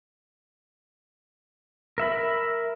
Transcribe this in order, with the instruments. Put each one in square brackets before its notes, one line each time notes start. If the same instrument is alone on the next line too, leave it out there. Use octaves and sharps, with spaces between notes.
[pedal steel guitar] A#4 E5 B5